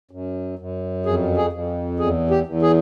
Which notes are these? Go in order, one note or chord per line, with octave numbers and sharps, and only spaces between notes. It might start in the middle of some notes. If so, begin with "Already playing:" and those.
F#2
F#2
F2 G#4
G#4
F2
E2 G#4
G4
E2
G#4